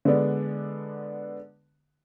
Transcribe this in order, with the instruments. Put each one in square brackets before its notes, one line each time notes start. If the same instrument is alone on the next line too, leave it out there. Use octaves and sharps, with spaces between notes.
[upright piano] D3 G#3 B3 D4